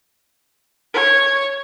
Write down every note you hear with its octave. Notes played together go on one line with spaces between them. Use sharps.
C#5